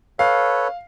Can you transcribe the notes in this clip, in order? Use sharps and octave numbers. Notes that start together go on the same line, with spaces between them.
A4 B4 C#5 F5